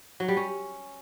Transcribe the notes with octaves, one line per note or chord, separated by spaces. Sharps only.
F#3
G3
C#4